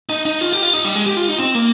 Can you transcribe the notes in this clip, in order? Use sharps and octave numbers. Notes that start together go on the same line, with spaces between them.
D#4
D#4
F4
G4
F4
D#4
G3
G#3
G4
F4
D#4
C4
A#3